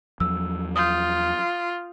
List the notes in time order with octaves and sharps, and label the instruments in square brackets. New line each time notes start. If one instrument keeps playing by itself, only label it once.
[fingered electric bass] E2 F3 F#3 [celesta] E6
[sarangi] F4 [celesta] D#6 G6